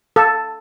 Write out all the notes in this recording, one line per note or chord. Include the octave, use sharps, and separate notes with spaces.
A4